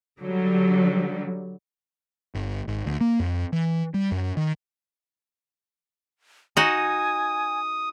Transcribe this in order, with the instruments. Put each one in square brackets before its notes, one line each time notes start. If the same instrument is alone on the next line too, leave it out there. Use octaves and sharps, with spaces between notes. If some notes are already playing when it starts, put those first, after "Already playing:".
[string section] D3 F#3 G3
[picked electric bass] G1
G#1
D2
A#3
F2
E3
G3
F#2
D#3
[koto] D#4 F#4 [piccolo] G#5 [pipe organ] D#6